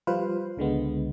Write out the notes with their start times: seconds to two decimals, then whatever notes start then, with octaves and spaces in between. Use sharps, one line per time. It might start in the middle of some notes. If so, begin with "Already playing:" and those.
0.07 F3 G3 F4 B4 C5 F5
0.57 C#2 D3 G#3 B3